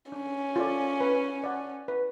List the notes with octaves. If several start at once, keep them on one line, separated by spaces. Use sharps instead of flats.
C#4 D4
F4 A4 D5
B4
D5 F#5
B4